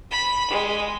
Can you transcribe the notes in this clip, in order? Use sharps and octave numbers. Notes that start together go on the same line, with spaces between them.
B5
G#3